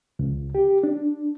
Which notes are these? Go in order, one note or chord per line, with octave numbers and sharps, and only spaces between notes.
C#2
G4
D4